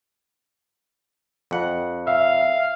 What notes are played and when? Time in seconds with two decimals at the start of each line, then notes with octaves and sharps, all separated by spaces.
1.51 F2 F#5
2.07 E5 F5